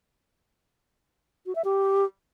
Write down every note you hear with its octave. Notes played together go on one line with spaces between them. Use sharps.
F#4
E5
G4